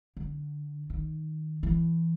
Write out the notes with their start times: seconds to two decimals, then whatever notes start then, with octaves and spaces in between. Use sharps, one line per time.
0.17 D3
0.90 D#3
1.63 E3